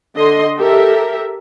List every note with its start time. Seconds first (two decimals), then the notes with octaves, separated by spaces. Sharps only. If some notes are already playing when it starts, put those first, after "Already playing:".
0.16 D3 D#5 C6
0.58 G4 A4 A#4 E5